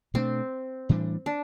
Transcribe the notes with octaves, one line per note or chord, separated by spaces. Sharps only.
B2 A3 C4 D4
A2 E3 G3 D4
D4